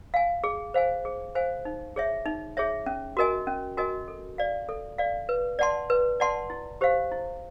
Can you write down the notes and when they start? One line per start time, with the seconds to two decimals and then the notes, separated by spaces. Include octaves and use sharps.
0.14 F5 G#5
0.44 G#4
0.74 C5 F5 G#5
1.05 G#4
1.35 C5 F5 G#5
1.65 D#4
1.96 G#4 C#5 E5
2.26 D#4
2.57 G#4 C#5 E5
2.86 C#4
3.17 F#4 A#4 D#5 G#5
3.47 C#4
3.77 F#4 A#4 D#5 G#5
4.08 A4
4.38 D5 F5
4.69 A4
4.98 D5 F5
5.29 B4
5.59 D5 F#5 A5 C6
5.90 B4
6.20 D5 F#5 A5 C6
6.50 E4
6.81 G4 C5 F5
7.11 E4